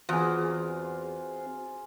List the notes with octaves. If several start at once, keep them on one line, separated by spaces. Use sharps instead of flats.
E2 C4 F4 F#4 G#4 C5